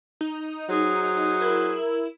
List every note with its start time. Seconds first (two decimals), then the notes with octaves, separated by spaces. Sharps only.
0.21 D#4
0.70 F#3 G#4 C5
1.42 E4 A#4